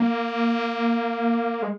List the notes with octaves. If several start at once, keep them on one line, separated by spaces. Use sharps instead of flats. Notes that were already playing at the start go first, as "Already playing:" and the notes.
Already playing: A#3
G#3